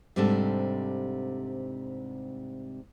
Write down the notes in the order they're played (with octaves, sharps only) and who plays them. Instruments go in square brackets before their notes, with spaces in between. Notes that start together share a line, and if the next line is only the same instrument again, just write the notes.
[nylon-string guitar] G#2 C3 G3 C4 D4 A4